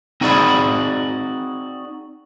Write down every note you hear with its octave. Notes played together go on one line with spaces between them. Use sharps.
C4 D#4 F#4 G#4 D5 B5